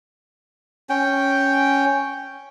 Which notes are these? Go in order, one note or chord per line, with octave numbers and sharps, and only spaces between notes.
C#4 G5